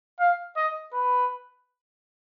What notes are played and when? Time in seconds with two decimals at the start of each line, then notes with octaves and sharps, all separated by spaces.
0.20 F5
0.56 D#5
0.93 B4